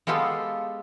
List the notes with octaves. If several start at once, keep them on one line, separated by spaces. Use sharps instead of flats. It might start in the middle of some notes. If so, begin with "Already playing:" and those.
G#3 B3 F4 G4 A4